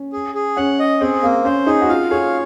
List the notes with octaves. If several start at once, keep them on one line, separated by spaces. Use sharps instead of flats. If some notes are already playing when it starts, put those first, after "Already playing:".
Already playing: C#4
G#4
G#4
C#4 F#5
D#5
C4 G#4
A#3 C4
C#4 C5
D#4 G#4
F#4
F4 F5
G#4 C#5